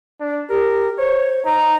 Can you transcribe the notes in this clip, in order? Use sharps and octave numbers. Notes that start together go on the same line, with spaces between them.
D4
G4 A#4
C5 C#5
D#4 A#5